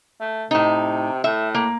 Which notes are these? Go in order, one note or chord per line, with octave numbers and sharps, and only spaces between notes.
A3
A2 C3 D#4
A2 E5
A#3